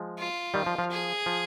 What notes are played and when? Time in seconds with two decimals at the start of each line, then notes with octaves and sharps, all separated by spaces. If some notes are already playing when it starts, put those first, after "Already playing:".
Already playing: F3 G#3
0.19 F4
0.54 D#3 G3
0.66 F3
0.79 F3
0.91 G#4
1.26 F3